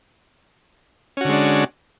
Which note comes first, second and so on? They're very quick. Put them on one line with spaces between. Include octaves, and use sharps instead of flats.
C#4 F#4 D3 G#3 D4